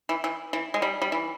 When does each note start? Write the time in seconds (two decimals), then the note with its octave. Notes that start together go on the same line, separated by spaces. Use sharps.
0.09 E3
0.24 E3
0.53 E3
0.74 G#3
0.82 G3
1.02 G3
1.12 E3